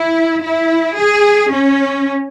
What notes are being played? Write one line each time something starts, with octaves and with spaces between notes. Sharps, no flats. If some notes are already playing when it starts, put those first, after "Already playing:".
Already playing: E4
E4
G#4
C#4